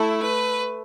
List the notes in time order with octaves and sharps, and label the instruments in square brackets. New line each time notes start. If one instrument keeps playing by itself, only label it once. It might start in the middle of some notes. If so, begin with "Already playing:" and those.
Already playing: [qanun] A3 [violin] E4
[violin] B4